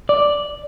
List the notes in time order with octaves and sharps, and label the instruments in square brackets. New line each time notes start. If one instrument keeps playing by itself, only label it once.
[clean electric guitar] D5